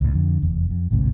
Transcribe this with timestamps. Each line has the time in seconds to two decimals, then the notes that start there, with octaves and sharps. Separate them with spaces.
0.01 C#2 A2
0.13 F2 D3
0.42 F1 E2
0.70 F2
0.91 A1 D2 G#2 C3